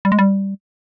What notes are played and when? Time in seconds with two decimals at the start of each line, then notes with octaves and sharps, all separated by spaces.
0.05 G3
0.12 G#3
0.19 G3